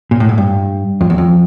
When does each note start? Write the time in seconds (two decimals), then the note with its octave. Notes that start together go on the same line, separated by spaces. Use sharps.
0.11 A#2
0.20 A2
0.29 G#2
0.38 G2
1.01 F2
1.10 E2
1.18 F2